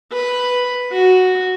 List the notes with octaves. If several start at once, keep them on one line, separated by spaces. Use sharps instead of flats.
B4
F#4